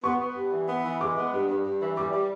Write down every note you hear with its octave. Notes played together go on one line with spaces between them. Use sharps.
B3 C#6
B3
G2
E3
B3
E3
G#3 D6
B3
G2
G2
G2
E3
G3 D6
G3